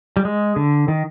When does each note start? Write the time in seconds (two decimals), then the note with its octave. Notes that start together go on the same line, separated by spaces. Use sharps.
0.17 G3
0.25 G#3
0.56 D3
0.88 D#3